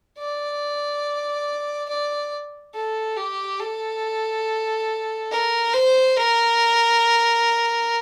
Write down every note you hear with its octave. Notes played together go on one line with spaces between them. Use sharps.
D5
D5
A4
G4
A4
A#4
C5
A#4